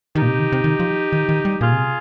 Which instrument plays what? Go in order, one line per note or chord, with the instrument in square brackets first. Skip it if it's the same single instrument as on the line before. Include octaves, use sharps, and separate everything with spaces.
[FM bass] D#3 [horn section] D#4 G4
[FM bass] A#2
C3
D#3
C3
D#3
F3
D#3
D#3
G3
[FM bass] A#2 [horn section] F4 G#4
[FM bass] C3